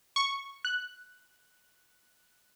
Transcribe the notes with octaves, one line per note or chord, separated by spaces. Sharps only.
C#6
F#6